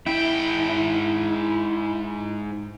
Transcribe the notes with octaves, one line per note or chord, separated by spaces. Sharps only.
G#2 E4 G5